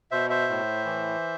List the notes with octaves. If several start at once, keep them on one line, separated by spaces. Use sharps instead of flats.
B2 C5 E5
C5 E5
A2
E3